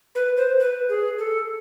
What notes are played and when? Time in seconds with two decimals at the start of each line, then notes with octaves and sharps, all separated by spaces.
0.15 B4
0.37 C5
0.60 B4
0.89 G#4
1.19 A4